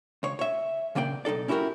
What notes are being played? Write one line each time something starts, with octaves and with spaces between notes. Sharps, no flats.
C#2 C#5
C#5 E5
A#2 C#3 A#3 D5 G5
B1 D#4 A4 D5
C#4 E4 F#4 G4 A#4